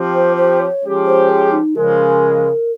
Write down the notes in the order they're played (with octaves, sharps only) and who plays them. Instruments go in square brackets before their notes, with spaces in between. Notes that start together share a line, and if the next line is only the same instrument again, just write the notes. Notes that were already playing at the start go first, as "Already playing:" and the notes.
Already playing: [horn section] F3 C4 G4
[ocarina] C5
C5
C#5
[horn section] F3 G#3 C#4 G4
[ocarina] C5
G#4
D#4
[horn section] C#3 F3 G#3 [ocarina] A#4